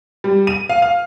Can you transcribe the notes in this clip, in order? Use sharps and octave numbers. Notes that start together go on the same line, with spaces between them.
G3
D#7
F5
F5